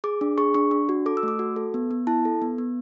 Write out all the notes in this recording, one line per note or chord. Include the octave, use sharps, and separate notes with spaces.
G#4 D6
D4
G#4 C#6
D4 C#6
D4
F#4
A4 D6
E6
A3 D6
F#4
A4
B3
B3
E4 A5
A4
B3
B3